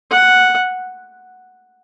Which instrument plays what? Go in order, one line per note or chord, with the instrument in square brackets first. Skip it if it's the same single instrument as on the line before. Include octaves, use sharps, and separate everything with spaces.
[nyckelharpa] F#5